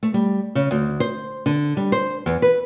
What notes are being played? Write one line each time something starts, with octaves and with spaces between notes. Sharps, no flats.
A3
G3
C#3
D2
C5
D3
G3
C5
E2
B4